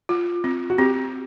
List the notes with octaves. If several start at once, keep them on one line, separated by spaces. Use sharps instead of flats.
F4
C4
F#4
C4 G4